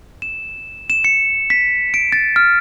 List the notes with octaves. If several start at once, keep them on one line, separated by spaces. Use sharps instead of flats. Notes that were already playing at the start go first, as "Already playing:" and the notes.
E7
E7
C#7
B6
D7
A6
F6